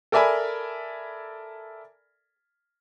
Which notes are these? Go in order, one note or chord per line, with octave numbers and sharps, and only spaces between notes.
A4 A#4 D5 E5 G#5 B5